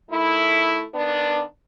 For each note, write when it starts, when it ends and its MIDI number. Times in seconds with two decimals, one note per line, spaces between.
0.11 0.85 51
0.11 0.85 57
0.11 0.85 64
0.95 1.41 51
0.95 1.41 59
0.95 1.41 62